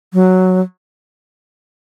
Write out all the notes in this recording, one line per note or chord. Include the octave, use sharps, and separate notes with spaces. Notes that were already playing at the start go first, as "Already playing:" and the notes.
F#3